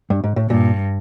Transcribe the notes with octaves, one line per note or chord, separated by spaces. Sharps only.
G2
G#2
A2
G2 A#2